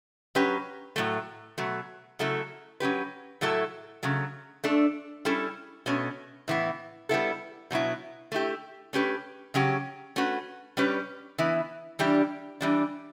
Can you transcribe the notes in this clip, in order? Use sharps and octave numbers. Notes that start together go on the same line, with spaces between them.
F#3 C#4 G4 B4
A2 F#3 A3
B2 F#3 A3
C#3 F#3 A3 E4 A4
F#3 C#4 G4 B4
A2 F#3 A3 E4 A4
C#3 F#3 A3
A3 D4 A4
G3 C#4 E4 A4
B2 A3 C#4
A2 E3 B3 E4
G3 B3 E4 A4
B2 F#3 B3 E4
A3 E4 G4
A3 C#4 G4 B4
C#3 F#3 C#4 G4
A3 C#4 F#4 B4
G3 C#4 G4 B4
E3 B3 E4
E3 G3 D4 G4
E3 G3 D4